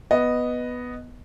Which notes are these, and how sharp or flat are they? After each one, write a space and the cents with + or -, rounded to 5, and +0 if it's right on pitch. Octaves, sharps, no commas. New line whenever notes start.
B3 +0 D#5 -5